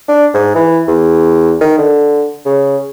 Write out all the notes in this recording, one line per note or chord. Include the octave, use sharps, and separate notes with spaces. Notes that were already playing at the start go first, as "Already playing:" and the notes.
D4
G#2
E3
E2
D#3
D3
C#3